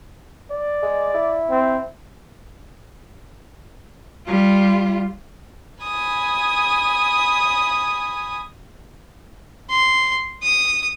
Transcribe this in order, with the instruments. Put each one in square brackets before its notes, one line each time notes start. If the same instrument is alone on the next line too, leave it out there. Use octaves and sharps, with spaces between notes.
[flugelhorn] D5
[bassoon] G#3
E4
[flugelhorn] C4
[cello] G3 F4
[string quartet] G#5 B5 D#6
[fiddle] C6
D#6